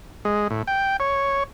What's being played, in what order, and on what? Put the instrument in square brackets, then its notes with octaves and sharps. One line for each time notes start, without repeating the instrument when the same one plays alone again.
[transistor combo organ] G#3
A2
G5
C#5